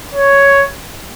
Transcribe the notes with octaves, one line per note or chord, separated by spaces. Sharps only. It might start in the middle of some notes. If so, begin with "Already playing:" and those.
C#5